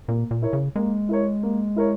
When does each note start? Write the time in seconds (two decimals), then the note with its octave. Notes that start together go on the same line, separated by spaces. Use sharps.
0.08 A#2 A#3
0.31 A#2
0.42 E4 A#4 C#5
0.53 C#3
0.76 G#3 A#3
1.09 E4 A#4 C#5
1.43 A#3
1.76 E4 A#4 C#5